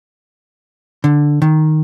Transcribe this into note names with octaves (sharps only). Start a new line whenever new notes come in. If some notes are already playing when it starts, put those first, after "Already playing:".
D3
D#3